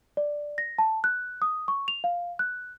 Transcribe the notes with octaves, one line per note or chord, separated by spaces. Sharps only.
D5
A#6
A5
F#6
D#6
C#6
F7
F5
F#6